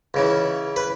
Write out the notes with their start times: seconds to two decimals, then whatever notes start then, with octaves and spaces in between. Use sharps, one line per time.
0.14 C#2 C#3 E3
0.76 B4